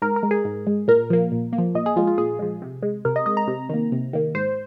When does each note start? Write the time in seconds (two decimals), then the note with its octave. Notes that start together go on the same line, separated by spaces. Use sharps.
0.02 G#2 A#4
0.16 A#4
0.23 G#3
0.31 G#4
0.45 G#2
0.67 G#3
0.88 A#2 A#4
1.10 F3 A#3
1.32 A#2
1.53 A#3
1.58 F3
1.75 A#2 D#5
1.86 G#4
1.96 F3 G#3 F4
2.07 F4
2.18 A#2 G#4
2.39 F3 G#3
2.62 C3
2.83 G#3
3.05 C3 A#4
3.16 D#5
3.26 G#3 D#5
3.37 A#5
3.48 C3
3.69 D#3 A#3
3.92 C3
4.13 D#3 A#3
4.35 G#2 C5